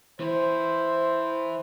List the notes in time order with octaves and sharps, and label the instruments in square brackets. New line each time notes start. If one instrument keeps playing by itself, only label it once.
[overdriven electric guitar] E3 E4 [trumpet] C5